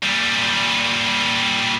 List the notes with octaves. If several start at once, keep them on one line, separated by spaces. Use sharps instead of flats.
A#2 G3